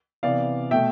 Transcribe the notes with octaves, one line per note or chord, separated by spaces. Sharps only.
C3 E3 B3 D5 F5
B2 A3 E5 G5